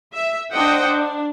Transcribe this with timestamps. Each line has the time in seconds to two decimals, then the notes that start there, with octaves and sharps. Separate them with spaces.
0.14 E5
0.52 D4 C5 D#5 F#5 G5
0.86 D4